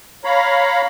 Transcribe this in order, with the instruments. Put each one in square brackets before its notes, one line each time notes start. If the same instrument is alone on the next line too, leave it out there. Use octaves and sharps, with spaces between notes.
[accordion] C#5 F5 A#5 B5